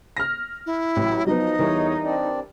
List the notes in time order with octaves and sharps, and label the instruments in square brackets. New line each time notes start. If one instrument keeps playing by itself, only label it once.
[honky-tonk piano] F6 A#6
[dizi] E4
[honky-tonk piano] A1 [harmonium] F#3
[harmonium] F3 [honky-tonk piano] F#3 B3 [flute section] D#4 [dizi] D#5
[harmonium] E2 C#5 [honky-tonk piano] E3 G3 A#4
[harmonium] C4 D4 D5